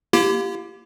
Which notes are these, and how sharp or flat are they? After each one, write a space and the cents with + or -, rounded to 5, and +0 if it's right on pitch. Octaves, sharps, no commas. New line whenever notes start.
A#3 +20 E4 +45 G4 -5